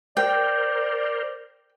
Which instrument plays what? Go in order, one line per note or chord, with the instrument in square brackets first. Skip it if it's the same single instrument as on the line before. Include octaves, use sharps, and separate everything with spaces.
[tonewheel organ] A#4 C5 [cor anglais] D5 [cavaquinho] G5